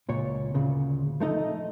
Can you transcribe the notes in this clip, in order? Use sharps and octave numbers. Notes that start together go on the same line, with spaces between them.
C#2 A#2 C#5
D2 A#2 C#3
F3 A3 D#4 D#5